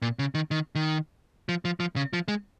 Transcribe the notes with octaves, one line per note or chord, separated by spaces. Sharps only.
A#2
C#3
D#3
D#3
D#3
F3
F3
F3
C#3
F3
G#3